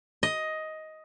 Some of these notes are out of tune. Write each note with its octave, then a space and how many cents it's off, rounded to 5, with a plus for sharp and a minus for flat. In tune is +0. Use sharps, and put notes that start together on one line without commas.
D#5 +10